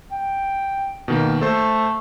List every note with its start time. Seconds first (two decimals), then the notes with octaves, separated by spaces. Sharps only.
0.12 G5
1.08 B2 D#3 A#3
1.41 A3 A4 C5